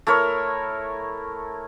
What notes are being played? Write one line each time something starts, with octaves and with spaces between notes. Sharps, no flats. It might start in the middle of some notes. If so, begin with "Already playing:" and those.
A3 E4 A#4 C#5